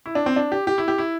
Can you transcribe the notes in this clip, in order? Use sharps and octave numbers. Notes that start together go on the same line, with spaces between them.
E4
D4
C4
D4
G4
G4
E4
G4
E4